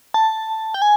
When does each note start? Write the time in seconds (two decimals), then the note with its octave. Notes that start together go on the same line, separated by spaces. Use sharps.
0.14 A5
0.74 G5
0.82 G#5